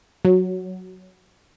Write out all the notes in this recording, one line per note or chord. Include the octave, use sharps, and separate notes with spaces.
F#3